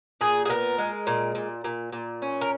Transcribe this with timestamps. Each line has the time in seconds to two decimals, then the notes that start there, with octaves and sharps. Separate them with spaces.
0.21 A#2 G#4
0.45 G#4
0.49 B3 A#4
0.78 G#3
1.07 A#2
1.35 A#2
1.64 A#2
1.93 A#2
2.22 C#4
2.41 A#4